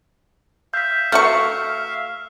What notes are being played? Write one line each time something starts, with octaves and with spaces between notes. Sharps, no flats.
E5 F5 G6 B6
A3 F#4 C#6 F6